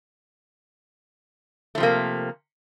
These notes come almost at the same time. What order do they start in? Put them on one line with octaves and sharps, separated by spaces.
A3 F3 C3 A#3